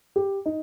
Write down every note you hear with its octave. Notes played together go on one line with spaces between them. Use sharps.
G4
D#4